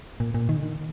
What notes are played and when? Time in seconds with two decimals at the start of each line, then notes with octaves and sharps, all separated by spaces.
0.20 A#2
0.34 A#2
0.49 D#3
0.56 D3
0.63 D#3